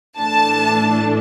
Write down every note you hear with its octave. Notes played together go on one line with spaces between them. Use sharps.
A2 E3 A3 D4 A5